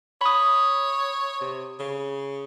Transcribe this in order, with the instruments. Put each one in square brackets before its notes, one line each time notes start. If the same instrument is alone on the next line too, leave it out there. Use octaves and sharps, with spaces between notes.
[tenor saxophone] C#5 [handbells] B5 D#6
[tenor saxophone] C3
C#3